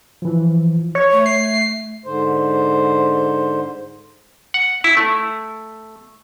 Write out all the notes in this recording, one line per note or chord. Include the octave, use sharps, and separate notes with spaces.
E3 F3
C#5
A3
C7
G#2 D3 C5
F#5
E4
A3